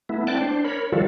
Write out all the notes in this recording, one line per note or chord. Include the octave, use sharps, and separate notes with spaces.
A3 B3 E4
C4 D5 G5 A5 F#6
D4 C5
A#4 C#5 B5
D#3 F3 G3 F4 F#4 A4